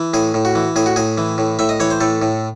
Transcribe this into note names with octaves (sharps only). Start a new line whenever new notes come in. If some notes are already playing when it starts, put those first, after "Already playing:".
Already playing: E3
A2 G#4
A2
F#4
E3
A2 G#4
F#4
A2 G#4
E3
A2
A2 E5
D#5
E3 C#5
C5
A2 A4
A2